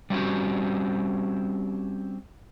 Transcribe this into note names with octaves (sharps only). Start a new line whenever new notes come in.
G3 C4 C#4 F#4 G4